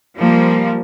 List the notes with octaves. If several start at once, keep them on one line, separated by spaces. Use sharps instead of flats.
F3 G3 A#3